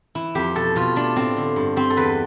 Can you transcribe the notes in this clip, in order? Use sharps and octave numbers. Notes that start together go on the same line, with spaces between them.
E3 E4
F2 G4
B2 A4
B2 F4
A3 D4
A2 C4
D3
G2
G3 C4
A4
E2 B4